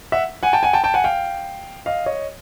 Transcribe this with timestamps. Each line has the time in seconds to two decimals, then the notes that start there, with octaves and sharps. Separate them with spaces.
0.12 E5 F#5
0.43 F#5 G#5
0.53 G5 A5
0.63 F#5 G#5
0.73 G5 A5
0.84 G5 A5
0.94 F#5 G#5
1.04 F5 G5
1.86 D#5 F5
2.06 C#5 D#5